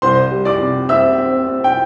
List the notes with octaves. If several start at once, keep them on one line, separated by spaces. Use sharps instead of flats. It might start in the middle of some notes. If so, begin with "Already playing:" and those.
C2 C5 C6
G3
D5 D6
C3
C4 E5 E6
C4
C4
G5